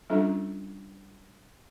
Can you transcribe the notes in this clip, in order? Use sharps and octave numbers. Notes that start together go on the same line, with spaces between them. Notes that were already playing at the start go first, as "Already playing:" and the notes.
G3 C#4 D4 F4 A4